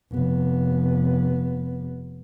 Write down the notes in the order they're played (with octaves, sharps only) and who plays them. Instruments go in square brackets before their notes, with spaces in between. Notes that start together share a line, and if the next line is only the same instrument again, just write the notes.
[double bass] F1 B3